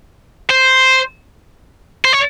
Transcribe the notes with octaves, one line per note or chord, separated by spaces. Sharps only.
C5
C5
C#5